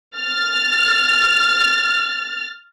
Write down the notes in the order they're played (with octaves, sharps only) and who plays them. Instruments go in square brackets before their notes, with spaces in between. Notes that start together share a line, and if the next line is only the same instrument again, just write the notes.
[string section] F6 A6